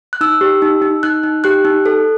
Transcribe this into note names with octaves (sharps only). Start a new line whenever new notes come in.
F#6
D#4 E6
G4
D#4
D#4
D#4 F#6
D#4
G4 F#6
D#4
A4